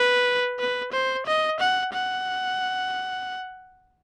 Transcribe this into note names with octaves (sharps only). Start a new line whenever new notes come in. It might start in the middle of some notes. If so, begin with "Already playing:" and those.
Already playing: B4
B4
C5
D#5
F#5
F#5